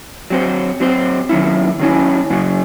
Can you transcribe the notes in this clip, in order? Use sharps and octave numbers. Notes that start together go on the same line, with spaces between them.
F#3 C4 F#4 C5
F#3 C4 F#4 C5
D#3 F#3 C#4 E4
D#3 F#3 C#4 E4
F#2 C#3 F#3